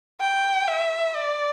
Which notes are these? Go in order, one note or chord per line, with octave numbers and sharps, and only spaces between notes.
G5
E5
D5